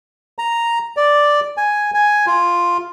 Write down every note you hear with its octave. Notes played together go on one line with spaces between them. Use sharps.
A#5
D5
G#5
G#5
F4